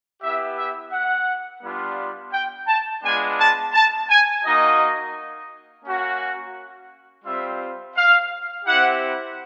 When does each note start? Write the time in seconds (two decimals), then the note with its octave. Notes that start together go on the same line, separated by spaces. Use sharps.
0.22 B3 E4 G4 E5
0.57 E5
0.92 F#5
1.63 G3 B3 D4 F4
2.33 G5
2.68 A5
3.03 G#3 B3 D4 F4 G#5
3.39 A5
3.73 A5
4.09 G#5
4.43 A#3 D#4 F#4 D#5
5.85 A#3 C#4 F#4
7.25 G3 C4 F4 E5
7.96 F5
8.65 C4 E4 G4 F#5